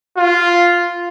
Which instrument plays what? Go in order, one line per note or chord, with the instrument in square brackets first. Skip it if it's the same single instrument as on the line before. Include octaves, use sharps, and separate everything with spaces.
[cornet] F4